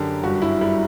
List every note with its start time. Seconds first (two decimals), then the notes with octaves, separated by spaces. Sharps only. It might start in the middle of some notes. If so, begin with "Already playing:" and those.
Already playing: F#2 D3 G4 A#4
0.23 G1 F#4
0.42 E4
0.61 G3 E4